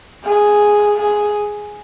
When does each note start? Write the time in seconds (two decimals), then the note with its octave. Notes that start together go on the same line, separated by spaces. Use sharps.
0.24 G#4
0.96 G#4